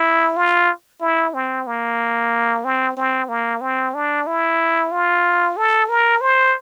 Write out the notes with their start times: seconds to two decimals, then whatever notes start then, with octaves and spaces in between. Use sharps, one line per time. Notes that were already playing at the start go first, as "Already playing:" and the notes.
Already playing: E4
0.37 F4
1.01 E4
1.34 C4
1.67 A#3
2.64 C4
2.97 C4
3.28 A#3
3.61 C4
3.94 D4
4.27 E4
4.92 F4
5.57 A4
5.89 A#4
6.21 C5